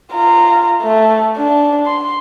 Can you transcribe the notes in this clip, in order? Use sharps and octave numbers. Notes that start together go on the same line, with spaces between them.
F4 A#5
A3
D4
C6